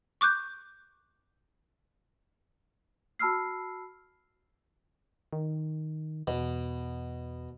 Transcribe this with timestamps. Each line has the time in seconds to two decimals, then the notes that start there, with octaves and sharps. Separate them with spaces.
0.21 C#6 D6 F#6 G6
3.19 F#4 A5 B5 E6 F6 C7
5.33 D#3
6.27 E2 B2